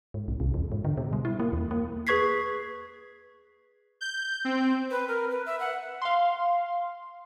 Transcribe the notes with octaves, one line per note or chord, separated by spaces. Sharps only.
G#2
B1
C2
E2
G#2
D3
B2
G3
E4
A#3
E2
A#3
G#4 B4 C#6 G#6 B6 C7
G6
C4
B4
A#4
B4
E5
F#5
F5 C6